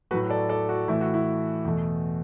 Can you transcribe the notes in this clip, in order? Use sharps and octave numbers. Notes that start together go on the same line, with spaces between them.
A2 F#3 A3 F#4 B4
A4 D5
A4 D5
F#4
A2 E3 A3 E4
F#4
E4
E2 B2 A3